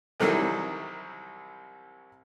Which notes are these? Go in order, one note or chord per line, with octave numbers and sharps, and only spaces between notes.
C2 C3 D#3 E3 F#3 G3